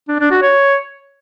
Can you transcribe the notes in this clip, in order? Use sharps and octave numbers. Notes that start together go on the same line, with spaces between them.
D4
D4
F#4
C#5